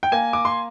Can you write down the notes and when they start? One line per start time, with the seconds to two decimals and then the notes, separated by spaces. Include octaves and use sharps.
0.03 G5
0.12 A#3 G#5
0.33 D6
0.45 C6